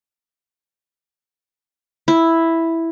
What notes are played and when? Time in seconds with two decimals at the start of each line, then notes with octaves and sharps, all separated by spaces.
2.08 E4